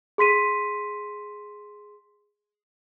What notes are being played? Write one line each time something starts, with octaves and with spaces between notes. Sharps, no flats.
G#4 C6 B6 D#7